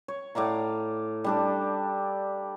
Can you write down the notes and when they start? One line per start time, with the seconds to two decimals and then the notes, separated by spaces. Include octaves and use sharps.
0.08 C#5
0.35 A2 D5 F5 A#5
1.24 G3 D4 A4